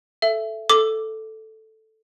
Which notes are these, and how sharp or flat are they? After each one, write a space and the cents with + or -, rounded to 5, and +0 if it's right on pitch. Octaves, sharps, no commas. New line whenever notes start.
A4 -5 E5 +20
A4 +0 D6 +0